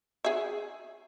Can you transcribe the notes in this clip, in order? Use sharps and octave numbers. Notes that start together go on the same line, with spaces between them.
G#4 E5